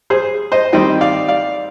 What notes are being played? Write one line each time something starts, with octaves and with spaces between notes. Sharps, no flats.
G#4 C5
C5 D#5
D#3 G3 C4 D#5 G5
D5 F5
D5 F5